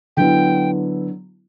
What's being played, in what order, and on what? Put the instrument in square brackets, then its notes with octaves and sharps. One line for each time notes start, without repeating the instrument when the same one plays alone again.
[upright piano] D3 F#3 B3 E4 [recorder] G5